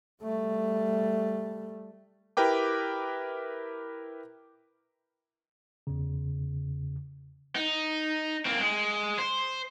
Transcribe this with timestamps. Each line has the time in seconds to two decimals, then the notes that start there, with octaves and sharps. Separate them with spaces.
0.23 G3 A3
2.37 E4 G4 A#4 B4 G5 D6
5.87 E2 C#3
7.56 D#4
8.45 A#3 C4
8.60 G#3
9.19 C5